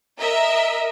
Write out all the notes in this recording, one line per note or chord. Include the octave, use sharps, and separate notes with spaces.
A#4 D#5 E5